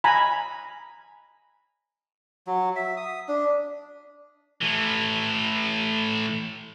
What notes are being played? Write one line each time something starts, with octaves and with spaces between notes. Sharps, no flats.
G#5 A#5 B5
F#3
E5
D#6
D4
A2 E3